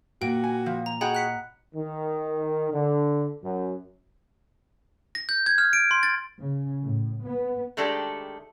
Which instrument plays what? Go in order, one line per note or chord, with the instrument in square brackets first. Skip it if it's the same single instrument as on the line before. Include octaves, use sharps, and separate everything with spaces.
[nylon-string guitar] A#2 [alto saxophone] F#4 [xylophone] G5
[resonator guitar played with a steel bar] G#5
F3
[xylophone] A#5
[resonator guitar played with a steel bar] F#4 G#4 G5 [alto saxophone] D#5 [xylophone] F#5 A#5 B5
[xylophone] F#6 B6 C#7
[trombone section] D#3
D3
F#2
[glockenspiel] A#6
G6
G#6
F6
D7
C6
A6
[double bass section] C#3
A2
B3
[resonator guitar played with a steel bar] D#3 G#3 A3 D4 G4 A4